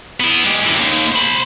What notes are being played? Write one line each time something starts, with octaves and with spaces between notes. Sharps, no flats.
B3 E4
G#3 G4
F#2 E3
D#2
C5 B5